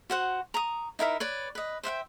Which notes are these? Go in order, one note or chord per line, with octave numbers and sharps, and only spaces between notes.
F#4 C5 F#5
A#5 C#6 D#6
D#4 E4 A#4 E5
B4 C#5 D5
B4 D#5
C5 E5 F#5 G5